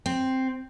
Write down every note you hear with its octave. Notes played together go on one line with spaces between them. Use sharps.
C4